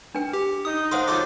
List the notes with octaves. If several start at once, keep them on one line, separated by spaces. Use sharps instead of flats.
D4 B4 G5
G4
D#4 D#6
A#4 C5 F5 F#5 C6
F#3 F4 A4 F#5 D6